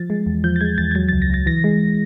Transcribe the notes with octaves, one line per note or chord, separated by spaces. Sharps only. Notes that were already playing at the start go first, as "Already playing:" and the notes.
Already playing: F3 A6
G#3
E2
F3 G6
A6
G#3 G#6
E2 A6
G#6
F#3 A6
C#2 A6
A#6
C#2 A6
E3 A#6
G#3